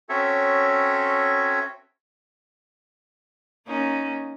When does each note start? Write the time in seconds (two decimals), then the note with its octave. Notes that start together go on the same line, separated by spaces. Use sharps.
0.09 C4 C#4 F#4 A4 C#5 E5
3.66 A#3 C#4 D#4